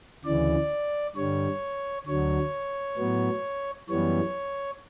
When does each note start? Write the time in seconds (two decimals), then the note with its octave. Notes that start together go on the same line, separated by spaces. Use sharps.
0.25 D2 C#3 E3 D5
1.15 G2 D3 G3 C#5
2.07 D2 D3 F#3 C#5
2.97 A2 F#3 B3
3.89 F#2 E3 G3 B3 C#5